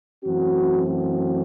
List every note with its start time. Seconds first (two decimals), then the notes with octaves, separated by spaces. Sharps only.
0.25 F#2 E3 A3 C4 F#4
0.89 F#4